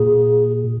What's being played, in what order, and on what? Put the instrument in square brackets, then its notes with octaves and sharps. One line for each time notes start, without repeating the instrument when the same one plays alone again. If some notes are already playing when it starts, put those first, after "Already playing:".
Already playing: [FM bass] A#2 [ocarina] G#4